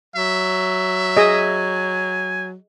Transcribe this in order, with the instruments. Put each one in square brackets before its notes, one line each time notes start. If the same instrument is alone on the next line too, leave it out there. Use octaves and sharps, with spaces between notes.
[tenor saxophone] F#3 [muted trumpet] E5
[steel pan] G#4 D#5 [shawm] G#5